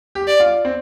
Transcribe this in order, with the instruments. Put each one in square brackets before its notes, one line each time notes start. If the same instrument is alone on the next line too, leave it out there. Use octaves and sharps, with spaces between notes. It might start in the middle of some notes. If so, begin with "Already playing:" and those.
[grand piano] G4
[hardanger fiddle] D5
[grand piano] F4
C4